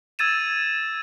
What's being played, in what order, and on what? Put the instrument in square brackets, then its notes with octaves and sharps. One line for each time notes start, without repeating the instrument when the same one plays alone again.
[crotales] E6 G#6 A6 D#7 E7